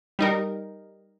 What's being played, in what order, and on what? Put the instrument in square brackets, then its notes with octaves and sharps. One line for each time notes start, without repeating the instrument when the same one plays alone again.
[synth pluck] G3 D#4 A#4